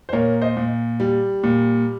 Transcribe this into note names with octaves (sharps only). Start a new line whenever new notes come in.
C5
A#2 A#4 C#5
C5 D#5
A#2
G3
A#2